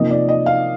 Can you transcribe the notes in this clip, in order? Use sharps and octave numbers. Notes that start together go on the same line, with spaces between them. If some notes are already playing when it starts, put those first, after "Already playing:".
Already playing: C3 F3 A#3 D#4 D#5
D5
D#5
F5